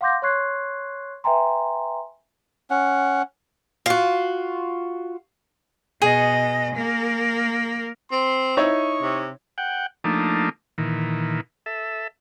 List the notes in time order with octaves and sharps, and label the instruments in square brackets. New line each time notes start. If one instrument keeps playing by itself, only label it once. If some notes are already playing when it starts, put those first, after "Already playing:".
[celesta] F5 F#5 C6 D6 G6 A#6
C#5 C6 C#6 F#6 G#6 C7
B4 E5 G5 G#5 A#5 C6
[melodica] C#4 F#5
[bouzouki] F4 F#4
[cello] B2 D#5 [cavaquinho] G#4
[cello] A#3 A#4
[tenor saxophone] C4 [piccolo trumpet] C6
[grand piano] D#4 E4 C#5 [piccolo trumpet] C#6
[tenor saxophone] C3
[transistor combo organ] F#5 G5
F3 A3 A#3 D4 D#4
A#2 D#3 E3
A4 E5